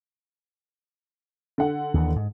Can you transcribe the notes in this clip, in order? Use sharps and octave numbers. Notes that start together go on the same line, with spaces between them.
D3 F#5
D#2 E3
G#2